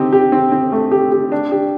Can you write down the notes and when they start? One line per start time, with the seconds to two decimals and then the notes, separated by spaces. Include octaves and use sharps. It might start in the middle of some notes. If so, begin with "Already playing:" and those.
Already playing: C4 D#4 G4
0.13 G4
0.32 C4
0.52 C4
0.72 A3
0.91 G4
1.12 G4
1.32 D4
1.51 G4